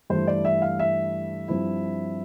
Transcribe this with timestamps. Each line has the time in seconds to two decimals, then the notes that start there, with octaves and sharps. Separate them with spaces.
0.10 G2 E3 A3 E4 C5
0.27 D5
0.45 E5
0.62 F5
0.79 E5
1.48 G2 F3 C4 E4